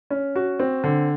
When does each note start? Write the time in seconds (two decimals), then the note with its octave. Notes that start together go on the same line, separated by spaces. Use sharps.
0.10 C#4
0.36 F#4
0.59 C4
0.84 D3